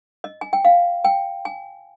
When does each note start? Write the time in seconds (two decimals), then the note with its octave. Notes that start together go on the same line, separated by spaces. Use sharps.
0.24 D#5
0.41 G#5
0.53 G5
0.65 F5
1.04 G5
1.45 G#5